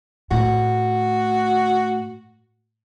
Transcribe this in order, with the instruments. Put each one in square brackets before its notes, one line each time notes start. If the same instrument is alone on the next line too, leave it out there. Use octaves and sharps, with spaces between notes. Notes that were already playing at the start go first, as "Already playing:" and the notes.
[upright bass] A2 [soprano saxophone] F#4